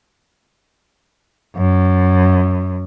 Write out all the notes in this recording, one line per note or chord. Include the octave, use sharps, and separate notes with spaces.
F#2